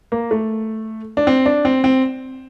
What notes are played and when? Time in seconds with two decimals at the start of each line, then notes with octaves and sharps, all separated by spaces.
0.12 A#3
0.31 A3
1.17 D4
1.27 C4
1.46 D4
1.65 C4
1.84 C4